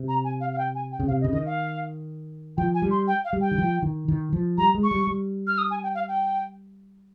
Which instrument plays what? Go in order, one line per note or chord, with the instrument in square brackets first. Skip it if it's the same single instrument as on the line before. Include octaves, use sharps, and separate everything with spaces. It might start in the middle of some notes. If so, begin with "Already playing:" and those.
Already playing: [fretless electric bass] C3
[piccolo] A#5
G#5
F5
F5
G5
G#5
G5
[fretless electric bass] C#3
[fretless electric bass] C3 [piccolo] F5
[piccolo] D#5
[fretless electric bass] C#3
[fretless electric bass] D#3 [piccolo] D#5
[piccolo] F5
[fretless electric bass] F3 [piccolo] G5
[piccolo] G#5
[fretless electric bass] G3
[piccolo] C6
G5
F5
[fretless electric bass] G3
[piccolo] G5
[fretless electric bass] D#3
F3
D#3
D#3
F3
[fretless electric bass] G3 [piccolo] A#5
[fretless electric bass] G#3
[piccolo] C#6
[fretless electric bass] G3
G3
[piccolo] F6
D#6
G#5
G5
F5
G5